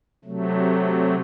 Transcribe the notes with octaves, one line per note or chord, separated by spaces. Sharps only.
C3 F#3 A3